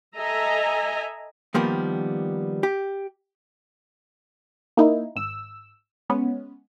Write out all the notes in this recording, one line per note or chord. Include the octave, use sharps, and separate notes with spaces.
A4 D#5 E5 G#5 A#5
D#3 F3 G3 A#3 B3
G4
A#3 D#4 E4
G#1 E6
G#3 B3 C#4